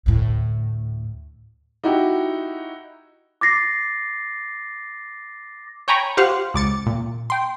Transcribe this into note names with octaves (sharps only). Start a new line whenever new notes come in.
D2 A2
D#4 E4 F#4 G4
D6 A6 A#6 C7
C#5 G5 G#5 A#5 B5 C#6
F4 G4 C5 F5 F#5
C#2 D6 A6 C#7
A#2
G5 C6